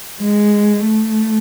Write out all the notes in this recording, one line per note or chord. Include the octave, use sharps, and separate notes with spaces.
G#3
A3